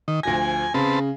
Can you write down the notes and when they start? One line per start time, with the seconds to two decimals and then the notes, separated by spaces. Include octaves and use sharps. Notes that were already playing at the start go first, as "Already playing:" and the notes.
0.08 D#3
0.23 D2 F3 G#5 A#6
0.74 C#3 C4 B4 A5